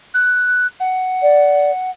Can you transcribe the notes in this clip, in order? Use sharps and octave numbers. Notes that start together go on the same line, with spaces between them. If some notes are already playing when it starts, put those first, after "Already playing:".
F#6
F#5
D5